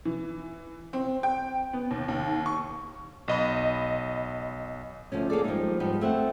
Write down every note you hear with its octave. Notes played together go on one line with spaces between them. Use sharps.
E3
C4
G5
B3
D#2
D#2
C#6
B1 D#5 B5
D2 D3 F3 C#4
A#3 G#4 A4 D5
F3 G3 G#3 C#4 D#4
G#2 F3 G3 B3 D#4
A3 C4 C#5 F#5